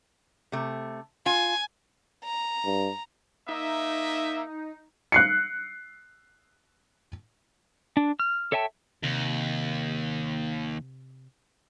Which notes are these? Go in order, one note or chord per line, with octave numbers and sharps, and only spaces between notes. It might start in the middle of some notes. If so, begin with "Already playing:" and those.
C3 A3
F4 G#5
A#5
G2
A#3 D#4 D#5 E5
F#6 C7 C#7
D4
F6
A4 C#5 E5 G5 A5
D#2 C3